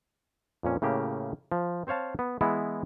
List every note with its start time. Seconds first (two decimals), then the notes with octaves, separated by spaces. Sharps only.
0.63 F2 A#2 C#4
0.82 A2 C#3 A#3 G4
1.52 F3
1.87 C4 C5 C#5 F5 A5
2.19 B3
2.41 E3 G#3 B3 E4